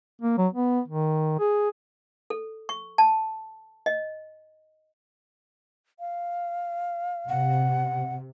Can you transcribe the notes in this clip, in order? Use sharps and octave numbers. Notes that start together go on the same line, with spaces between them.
A#3
F#3
B3
D#3
G#4
A4
C#6
A5
D#5
F5
C3 F#5